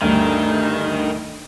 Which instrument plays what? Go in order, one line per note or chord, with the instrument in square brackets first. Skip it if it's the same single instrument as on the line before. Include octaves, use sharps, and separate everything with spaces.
[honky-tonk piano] D2 G2 [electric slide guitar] D#3